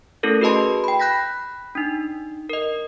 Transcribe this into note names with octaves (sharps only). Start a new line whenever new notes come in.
A3 C#4 E4 A4 A#4
F#4 G#4 B4 D#5 A5 C6
G5 B5
B5 F#6 G6 A#6 B6
D4 D#4
A#4 D#5